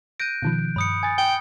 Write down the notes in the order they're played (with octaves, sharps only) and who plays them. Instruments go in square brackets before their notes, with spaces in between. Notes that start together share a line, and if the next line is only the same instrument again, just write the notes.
[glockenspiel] F#6 G6 D7 [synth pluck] A#6 D#7
[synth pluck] B2 D#3 F3
[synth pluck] G2 [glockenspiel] B5 D#6 C#7
[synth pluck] G#5 A6
[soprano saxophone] G5